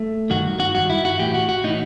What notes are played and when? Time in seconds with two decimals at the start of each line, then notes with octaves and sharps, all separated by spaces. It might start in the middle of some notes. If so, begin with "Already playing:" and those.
Already playing: A3
0.30 G2 D#3 F#4
0.60 F#4
0.75 G2 D#3 F#4
0.90 E4
1.05 F#4
1.19 A2 E3 G4
1.34 F#4
1.49 F#4
1.64 A2 E3 D#4